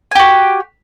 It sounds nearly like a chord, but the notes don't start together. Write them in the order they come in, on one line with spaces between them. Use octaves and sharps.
G#5 G4 F#4